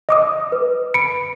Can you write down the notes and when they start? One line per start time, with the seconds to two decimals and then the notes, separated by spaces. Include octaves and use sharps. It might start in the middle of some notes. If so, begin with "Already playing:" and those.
0.09 D#5 D6 D#6
0.52 B4
0.94 B5 C#7 D7